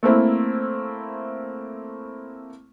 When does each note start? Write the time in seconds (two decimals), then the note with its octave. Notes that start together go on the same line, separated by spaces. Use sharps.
0.03 A3 A#3 C4 E4